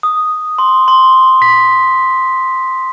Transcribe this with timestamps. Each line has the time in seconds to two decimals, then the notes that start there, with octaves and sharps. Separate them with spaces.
0.03 D#6
0.58 C6
0.88 C6
1.42 B6